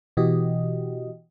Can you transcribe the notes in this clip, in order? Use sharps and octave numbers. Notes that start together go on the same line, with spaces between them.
B2 E3 F#4 G4 D#5